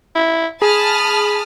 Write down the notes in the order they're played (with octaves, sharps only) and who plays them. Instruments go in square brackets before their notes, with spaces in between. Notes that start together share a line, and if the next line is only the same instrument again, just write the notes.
[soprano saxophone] E4
[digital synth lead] G#4 [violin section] A5 D#6 F6 [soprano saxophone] B5